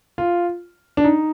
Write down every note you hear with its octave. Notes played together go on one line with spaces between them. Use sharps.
F4
D4
D#4